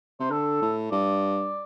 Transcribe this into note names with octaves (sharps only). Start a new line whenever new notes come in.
C3 C5
D3 A4
A2
G2 D5